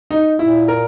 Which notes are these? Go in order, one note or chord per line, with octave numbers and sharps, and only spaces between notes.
D#4
A#2 E4
A#4